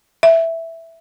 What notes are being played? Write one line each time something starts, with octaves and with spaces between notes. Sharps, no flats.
E5